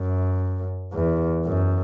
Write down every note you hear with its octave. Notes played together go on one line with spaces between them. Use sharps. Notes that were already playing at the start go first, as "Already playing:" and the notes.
Already playing: F#2
E2
F#2